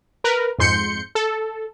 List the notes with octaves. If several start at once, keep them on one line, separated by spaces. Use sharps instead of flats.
A#4 B4
F2 G#2 C6 G6 C#7
A4